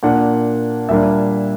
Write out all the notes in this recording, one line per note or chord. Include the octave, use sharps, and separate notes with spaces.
A#2 A#3 D4 F#5
A#2 G3 A#3 D4 E5